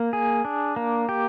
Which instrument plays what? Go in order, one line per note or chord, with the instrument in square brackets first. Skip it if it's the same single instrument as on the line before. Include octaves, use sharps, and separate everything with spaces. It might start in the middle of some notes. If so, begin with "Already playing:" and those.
Already playing: [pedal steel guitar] A#3
G#4
D4
A#3
G4